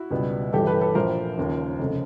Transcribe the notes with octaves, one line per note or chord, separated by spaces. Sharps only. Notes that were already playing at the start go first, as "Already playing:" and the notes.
Already playing: E4 F#4
C#2 B2 G3 B3
G1 G2 E3 G4 A4
A4 B4
A4 B4
A#1 A#2 F3 A#4 C5
D#2 C#3 F3
F1 C#3